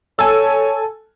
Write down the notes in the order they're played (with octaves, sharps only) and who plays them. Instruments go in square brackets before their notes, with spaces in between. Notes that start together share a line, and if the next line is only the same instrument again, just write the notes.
[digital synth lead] A4 [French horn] C#5 [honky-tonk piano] G#5 E6